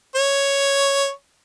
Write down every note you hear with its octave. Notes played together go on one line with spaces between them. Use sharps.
C#5